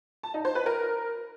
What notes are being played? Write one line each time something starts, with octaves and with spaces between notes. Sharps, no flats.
A5
D#4
C5
B4
A#4